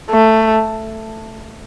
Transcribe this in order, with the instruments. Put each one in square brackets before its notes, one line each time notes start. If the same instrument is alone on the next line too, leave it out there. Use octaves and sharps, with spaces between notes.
[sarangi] A3